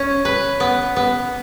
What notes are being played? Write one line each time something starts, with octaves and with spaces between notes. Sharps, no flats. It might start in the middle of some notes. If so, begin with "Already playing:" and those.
Already playing: C#4
B4
B3
B3